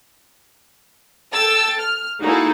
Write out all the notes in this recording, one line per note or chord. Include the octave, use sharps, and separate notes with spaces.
A4 G5 A5 E6 A6
F6
A#3 D#4 E4 F#4 G#4 A4